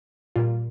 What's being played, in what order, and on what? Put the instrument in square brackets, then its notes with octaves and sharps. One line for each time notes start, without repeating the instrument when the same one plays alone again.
[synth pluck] A#2 G3 A#3 F4